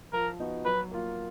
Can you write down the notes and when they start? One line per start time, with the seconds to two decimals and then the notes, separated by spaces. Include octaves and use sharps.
0.13 F3 A#4
0.39 B3 D#4 F#4
0.65 F#3 B4
0.91 A#3 F4